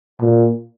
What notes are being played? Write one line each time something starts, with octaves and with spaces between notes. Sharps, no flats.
A#2